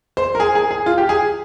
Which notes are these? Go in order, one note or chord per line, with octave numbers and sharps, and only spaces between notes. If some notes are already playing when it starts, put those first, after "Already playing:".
C5
A#4
G#4
G#4
G#4
F4
G4
G#4